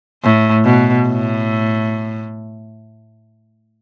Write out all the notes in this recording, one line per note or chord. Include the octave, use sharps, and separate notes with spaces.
A2
B2
A2